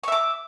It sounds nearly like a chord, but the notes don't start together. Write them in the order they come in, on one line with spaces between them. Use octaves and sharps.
C#6 E5 D6